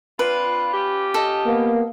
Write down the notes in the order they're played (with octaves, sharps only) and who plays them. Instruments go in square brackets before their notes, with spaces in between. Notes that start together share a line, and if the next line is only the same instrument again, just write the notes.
[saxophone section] C4 D4 F4 [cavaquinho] B4
[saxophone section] C#4 F4 G4
[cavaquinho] A4 D#5
[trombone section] A#3 B3